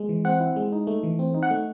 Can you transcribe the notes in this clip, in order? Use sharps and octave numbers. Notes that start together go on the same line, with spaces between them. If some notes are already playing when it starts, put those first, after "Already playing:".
Already playing: G#3
E3
C4 F#5
E4
G#3
D#4
A3
E3
C4
D#4
F#5
A3